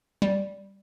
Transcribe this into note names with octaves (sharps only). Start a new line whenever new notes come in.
G3